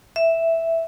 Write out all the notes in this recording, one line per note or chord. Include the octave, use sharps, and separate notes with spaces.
E5